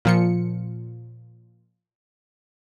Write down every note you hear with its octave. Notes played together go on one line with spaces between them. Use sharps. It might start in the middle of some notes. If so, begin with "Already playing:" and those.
A#2 F3 C#7